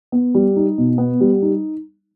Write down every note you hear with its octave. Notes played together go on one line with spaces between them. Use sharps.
B3
G3
D#4
B2
B3
G3
D#4